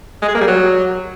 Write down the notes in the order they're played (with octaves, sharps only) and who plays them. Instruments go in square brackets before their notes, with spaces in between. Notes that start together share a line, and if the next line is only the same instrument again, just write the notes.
[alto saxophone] G#3
G#4
A#3
G3
F#3